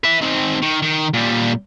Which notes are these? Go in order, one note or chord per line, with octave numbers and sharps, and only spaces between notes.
B4 E5
D#3 C4
D#3
D#3
A#2 G3